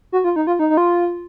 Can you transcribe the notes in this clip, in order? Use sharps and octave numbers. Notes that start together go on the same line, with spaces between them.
F#4
F4
D#4
F4
D#4
D#4
F4